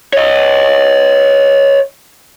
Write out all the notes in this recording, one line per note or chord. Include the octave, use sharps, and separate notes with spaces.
C#5 D#5